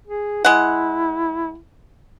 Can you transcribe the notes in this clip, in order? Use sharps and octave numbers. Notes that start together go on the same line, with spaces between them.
G#4
G#3 E4 F#5